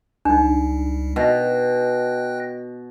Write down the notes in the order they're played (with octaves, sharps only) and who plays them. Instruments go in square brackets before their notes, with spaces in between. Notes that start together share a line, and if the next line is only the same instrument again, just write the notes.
[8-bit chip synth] C#2 G3 [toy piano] D4 D#4
[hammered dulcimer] B2 [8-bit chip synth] G5 F#6 A#6